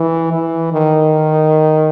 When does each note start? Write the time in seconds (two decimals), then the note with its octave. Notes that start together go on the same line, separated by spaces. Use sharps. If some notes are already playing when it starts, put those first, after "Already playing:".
Already playing: E3
0.32 E3
0.73 D#3